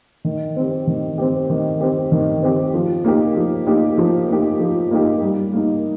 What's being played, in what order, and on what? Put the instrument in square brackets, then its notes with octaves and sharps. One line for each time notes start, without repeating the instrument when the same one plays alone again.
[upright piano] D#3
C4 G4
D#3
C4 G4
D#3
C4 G4
D#3
C4 G4
F3
A#3 D#4 G4
F3
A#3 D#4 G4
F3
A#3 D#4 G4
F3
A#3 D#4 G4
G3
A#3 D#4